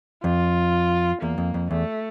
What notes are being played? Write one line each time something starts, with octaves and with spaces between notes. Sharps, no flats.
F2 F4
E2 A#3
F2
F2
E2 A3